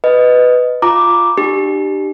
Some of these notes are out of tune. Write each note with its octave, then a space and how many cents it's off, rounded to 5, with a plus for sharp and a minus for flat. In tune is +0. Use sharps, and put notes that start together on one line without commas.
B4 +10 D#5 +0
F4 +0 A#5 +0 D6 +0
D4 +35 G4 -10